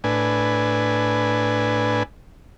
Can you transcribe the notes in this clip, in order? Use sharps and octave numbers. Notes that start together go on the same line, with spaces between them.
A2 D4 B4 G#5